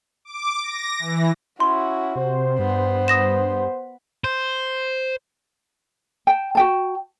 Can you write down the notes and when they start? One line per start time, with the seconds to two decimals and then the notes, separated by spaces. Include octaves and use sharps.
0.25 D6
0.63 A#6
0.99 E3
1.60 C#4 E4 F#4 C6
2.16 C3 C5
2.59 G2 B3
3.08 D#6 A#6 E7
4.24 C5
6.27 G5 A5
6.55 F#4 G5 A5